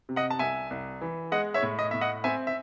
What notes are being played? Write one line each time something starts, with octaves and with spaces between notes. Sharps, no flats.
C3
D#5 F#5
A5
C2 E5 G#5
C2
E3
G#3 D#5 F#5
C#5 E5
A2
D#5
A2 E5
D#5 F#5
C4 E5 G#5
E5